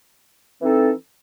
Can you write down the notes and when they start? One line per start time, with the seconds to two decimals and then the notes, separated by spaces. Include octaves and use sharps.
0.62 E3 C4 D#4 A4